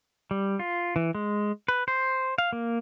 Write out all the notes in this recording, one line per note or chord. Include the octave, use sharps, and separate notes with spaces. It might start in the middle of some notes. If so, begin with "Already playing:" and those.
G3
F4
E3
G#3
B4
C5
F5
A#3